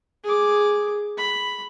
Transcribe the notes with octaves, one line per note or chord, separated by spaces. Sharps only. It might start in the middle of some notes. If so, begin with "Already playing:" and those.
G#4 D6
B5